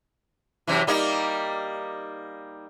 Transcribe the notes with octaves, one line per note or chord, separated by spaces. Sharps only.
F#2 C3 E3
G3 A#3 D#4